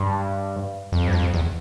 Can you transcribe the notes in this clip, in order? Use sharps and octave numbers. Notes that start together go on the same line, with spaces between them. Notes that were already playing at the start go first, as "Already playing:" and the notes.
Already playing: G2
F2
G2
F2
E2